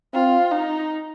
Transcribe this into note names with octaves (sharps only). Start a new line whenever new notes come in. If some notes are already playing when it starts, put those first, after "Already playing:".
C4 F4
D#4